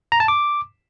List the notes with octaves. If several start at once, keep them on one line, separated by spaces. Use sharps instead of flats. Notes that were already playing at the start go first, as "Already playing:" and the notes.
A#5
A5
D6